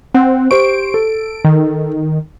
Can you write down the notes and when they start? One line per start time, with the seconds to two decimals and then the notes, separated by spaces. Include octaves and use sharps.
0.15 C4 F#5
0.51 G4 C5 C#6 D7
0.94 A4
1.45 D#3